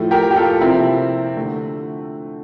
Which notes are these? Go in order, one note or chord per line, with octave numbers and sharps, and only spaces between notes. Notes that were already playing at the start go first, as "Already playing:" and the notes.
Already playing: A2 F3 A3
G4 A#4
G4
F4 A4
C3 F3 A#3 C4 E4
D3 A3